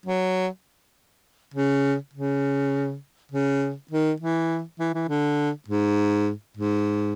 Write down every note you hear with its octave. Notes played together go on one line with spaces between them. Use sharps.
F#3
C#3
C#3
C#3
D#3
E3
E3
E3
D3
G#2
G#2